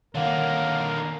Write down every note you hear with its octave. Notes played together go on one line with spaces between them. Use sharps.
D3 D#3 A#3 A#4 C#5 F5 F#5